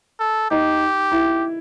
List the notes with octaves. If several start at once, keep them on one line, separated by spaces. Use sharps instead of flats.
A4
D#4 G4
E4